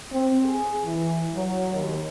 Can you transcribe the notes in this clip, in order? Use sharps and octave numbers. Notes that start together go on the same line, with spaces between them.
C4
G#4
E3
F#3
D#2